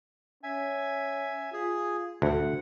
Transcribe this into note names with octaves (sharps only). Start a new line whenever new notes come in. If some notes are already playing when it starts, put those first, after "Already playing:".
C#4 E5 G#5
F4 G#4
D2 A3 F#5